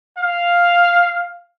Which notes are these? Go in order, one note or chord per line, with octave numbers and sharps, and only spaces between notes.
F5